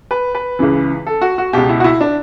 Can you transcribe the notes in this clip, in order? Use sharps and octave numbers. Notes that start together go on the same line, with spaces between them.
B4
B4
C#2 C#3 E3
A4
F#4
F#4
C#2 B2 G4
E4
F#4
E4
D4